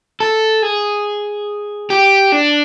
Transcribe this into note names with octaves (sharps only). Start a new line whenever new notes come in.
A4
G#4
G4
D4